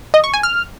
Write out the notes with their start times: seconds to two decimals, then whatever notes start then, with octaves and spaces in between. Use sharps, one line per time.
0.14 D#5
0.24 C#6
0.34 G#5
0.43 F6